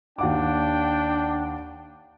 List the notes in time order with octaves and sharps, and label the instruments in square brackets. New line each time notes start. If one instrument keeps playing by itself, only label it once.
[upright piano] D#2 F#5 D6 [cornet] D4 [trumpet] G5